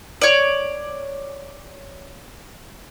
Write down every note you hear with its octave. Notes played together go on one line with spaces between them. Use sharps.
C#5 D5